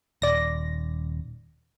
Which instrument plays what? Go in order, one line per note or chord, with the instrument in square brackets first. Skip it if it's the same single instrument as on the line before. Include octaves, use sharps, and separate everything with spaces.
[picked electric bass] D#1 [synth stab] D5 A#6